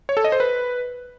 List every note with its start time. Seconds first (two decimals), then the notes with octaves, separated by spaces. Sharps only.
0.09 C#5
0.17 A4
0.24 D#5
0.32 C5
0.40 B4